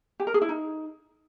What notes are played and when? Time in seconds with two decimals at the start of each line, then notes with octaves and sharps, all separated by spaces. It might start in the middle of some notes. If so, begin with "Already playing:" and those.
0.20 G4
0.27 A#4
0.34 G#4
0.42 E4
0.49 D#4